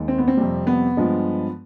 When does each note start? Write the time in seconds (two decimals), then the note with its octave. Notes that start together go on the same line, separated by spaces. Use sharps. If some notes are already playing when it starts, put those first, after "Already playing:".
Already playing: D#2 G#3
0.08 C4
0.18 B3
0.28 C4
0.37 F2 C3 G3
0.67 B3
0.97 G2 F3 G#3